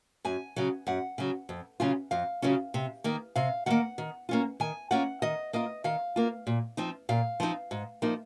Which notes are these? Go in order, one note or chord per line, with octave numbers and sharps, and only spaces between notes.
F#2 G#5
C#3 F#3
F#2 F#5
C#3 F#3
F2
C#3 F#3 C#4 F4
F2 F5
C#3 F#3 C#4 F4
C3
D#3 A#3
C3 F5
D#3 A#3 F#5
D#3
A#3 C#4 F4
D#3 G#5
A#3 C#4 F4 F#5
D#3 D#5
A#3 F4 D#5
D#3 F5
A#3 F4
A#2
F3 C4 D#4
A#2 F5
F3 C4 D#4
G#2
F3 A#3 D#4